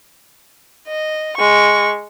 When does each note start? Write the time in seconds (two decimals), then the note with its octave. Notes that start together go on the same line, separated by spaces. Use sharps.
0.88 D#5
1.37 G#3 C#6